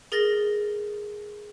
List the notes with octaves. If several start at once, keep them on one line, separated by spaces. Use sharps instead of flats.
G#4 A#4 A6 A#6